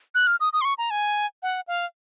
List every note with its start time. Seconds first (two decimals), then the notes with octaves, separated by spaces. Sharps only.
0.15 F#6
0.27 F6
0.40 D#6
0.53 D#6
0.61 C6
0.65 C#6
0.78 A#5
0.91 G#5
1.43 F#5
1.68 F5